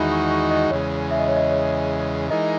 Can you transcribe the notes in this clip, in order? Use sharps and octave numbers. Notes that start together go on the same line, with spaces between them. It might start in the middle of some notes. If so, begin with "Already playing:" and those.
Already playing: E2 D#3 G#3 D#4 F#4 D#5 E5 B5
C#6
C#6
D#5
E2 C#3 G#3 C#5
E5
D#5
C#5
D#5
C#5
E3 G#3 D#4 A#4 D#5